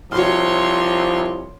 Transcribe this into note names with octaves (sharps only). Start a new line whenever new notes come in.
C2 F3 F#4 C#5 C6 F6